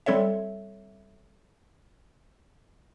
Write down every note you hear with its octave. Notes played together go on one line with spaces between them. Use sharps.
G3 C4 A4 C#5 E5